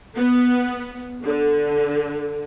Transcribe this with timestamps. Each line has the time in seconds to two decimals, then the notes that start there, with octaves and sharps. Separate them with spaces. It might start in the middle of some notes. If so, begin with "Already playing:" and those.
0.17 B3
1.23 D3